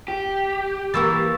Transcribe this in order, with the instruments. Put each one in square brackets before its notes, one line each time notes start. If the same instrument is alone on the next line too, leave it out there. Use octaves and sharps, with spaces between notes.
[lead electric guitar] G4
[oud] E3 A#3 A#4 [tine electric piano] C#6 E6 A6